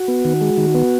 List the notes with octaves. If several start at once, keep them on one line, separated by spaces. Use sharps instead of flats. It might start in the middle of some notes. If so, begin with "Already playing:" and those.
Already playing: F#4
B3
D#3
G#3
D#3
B3